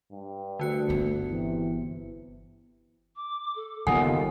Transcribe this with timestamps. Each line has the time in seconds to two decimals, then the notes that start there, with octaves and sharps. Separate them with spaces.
0.12 G2
0.59 D2 D3 F#4 C#7
0.89 G1 B3
1.30 C3 E3
3.16 D6
3.56 A4
3.87 F#1 D#2 F#3 B3 F4 A4 F#5 G#5